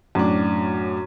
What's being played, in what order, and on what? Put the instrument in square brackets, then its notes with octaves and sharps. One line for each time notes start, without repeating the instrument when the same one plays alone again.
[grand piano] F#2 A2 D4